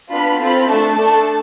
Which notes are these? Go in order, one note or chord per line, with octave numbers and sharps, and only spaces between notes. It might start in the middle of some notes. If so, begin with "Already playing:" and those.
B3 D4 F4 B5
C4 F4 A4 B5
A3 D4 A4 A5
A3 D4 A4